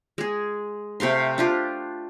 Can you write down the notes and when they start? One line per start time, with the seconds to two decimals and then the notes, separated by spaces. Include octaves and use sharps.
0.18 G#3 G#4
1.00 C3 A3 F5 C6
1.38 D4 F4 G4